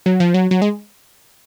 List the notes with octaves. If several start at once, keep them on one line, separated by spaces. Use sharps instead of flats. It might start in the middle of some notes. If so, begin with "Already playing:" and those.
F#3
F3
F#3
F#3
G#3